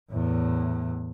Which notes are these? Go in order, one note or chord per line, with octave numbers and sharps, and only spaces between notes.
E2 A2